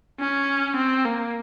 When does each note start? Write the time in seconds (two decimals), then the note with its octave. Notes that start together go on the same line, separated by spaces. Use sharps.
0.20 C#4
0.76 C4
1.05 A#3